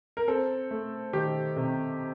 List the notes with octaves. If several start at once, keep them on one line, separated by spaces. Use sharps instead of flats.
A#4
C4 A4
A3
D#3 G4
C3